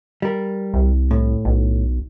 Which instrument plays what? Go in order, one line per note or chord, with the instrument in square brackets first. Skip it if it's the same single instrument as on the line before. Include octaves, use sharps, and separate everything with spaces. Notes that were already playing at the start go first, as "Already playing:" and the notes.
[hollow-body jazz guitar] G3 A#4
[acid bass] C2
[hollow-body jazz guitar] A2
[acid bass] B1